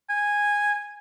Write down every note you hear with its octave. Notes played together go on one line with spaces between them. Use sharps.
G#5